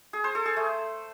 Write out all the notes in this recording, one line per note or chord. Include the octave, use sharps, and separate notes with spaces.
G#4
C5
A4
G#4
A3